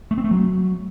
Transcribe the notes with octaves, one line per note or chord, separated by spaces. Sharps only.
A3
C4
A3
F#3